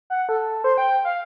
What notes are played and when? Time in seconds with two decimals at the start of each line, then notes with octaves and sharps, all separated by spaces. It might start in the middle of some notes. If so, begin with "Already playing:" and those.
0.10 F#5
0.29 A4
0.64 C5
0.78 G5
1.05 F5